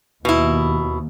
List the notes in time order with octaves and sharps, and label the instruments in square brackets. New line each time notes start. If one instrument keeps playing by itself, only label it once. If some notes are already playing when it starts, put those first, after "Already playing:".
[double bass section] D#2 [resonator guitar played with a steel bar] B2 E4